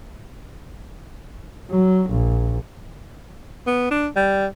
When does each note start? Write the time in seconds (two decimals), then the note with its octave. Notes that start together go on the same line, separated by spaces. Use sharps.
1.70 F#3
2.10 A#1
3.67 B3
3.91 D4
4.16 G3